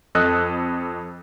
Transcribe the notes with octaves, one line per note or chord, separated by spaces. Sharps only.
F2 A4 D#5 D#6 E6 F#6